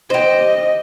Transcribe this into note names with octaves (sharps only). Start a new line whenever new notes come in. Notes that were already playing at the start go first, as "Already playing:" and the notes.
G4 C5 D#5